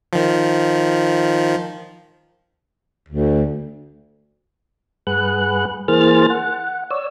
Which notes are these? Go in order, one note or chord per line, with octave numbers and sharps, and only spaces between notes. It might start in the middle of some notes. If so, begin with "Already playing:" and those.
D#3 F3
D2
G2 G#4 B4 F#5 F#6
E3 A#3 G#4 C5 F6 A6
F#5
C#5 D5 E6